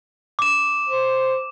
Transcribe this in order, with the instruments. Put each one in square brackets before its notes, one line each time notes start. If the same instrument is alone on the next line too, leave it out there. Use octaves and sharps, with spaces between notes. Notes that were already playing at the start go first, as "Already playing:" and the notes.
[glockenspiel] D6 E7
[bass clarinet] C5